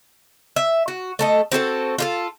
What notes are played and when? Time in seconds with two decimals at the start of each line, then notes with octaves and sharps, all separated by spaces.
0.56 E5
0.88 F#4
1.19 A3 A4 D#5
1.52 C4 F#4 G#4 A4
1.98 F4 G4 A4